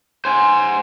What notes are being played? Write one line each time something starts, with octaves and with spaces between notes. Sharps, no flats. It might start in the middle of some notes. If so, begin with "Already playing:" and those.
C5 G#5